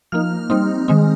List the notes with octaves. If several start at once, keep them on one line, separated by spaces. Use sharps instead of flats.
F3 A#3 D#4 F6
G3 C4 D#4
D#3 G#3 C4 D#4